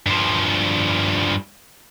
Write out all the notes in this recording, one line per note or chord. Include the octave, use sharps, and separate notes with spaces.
G2 F3